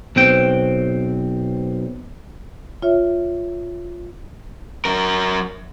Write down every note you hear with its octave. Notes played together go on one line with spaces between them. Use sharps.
B1 C4 G5
F4 C#5 E5
F#3 A#4